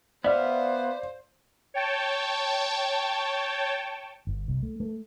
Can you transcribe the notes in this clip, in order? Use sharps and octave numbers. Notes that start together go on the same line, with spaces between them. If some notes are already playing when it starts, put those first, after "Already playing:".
B3 C5 D5 E5 F5 F6
C#5 G5 A5
G1
C2
A3
A3